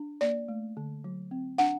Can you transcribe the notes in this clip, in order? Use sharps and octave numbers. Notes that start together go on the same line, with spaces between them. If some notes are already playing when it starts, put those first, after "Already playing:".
Already playing: D4
A#3 D5
A3
D3
F#3
C4
D4 F#5